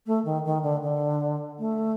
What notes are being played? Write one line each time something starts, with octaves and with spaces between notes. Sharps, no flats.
A3
D#3
D#3
D3
D3
A3